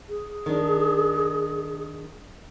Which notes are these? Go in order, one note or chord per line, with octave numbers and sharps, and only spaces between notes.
G#4
D#3 D4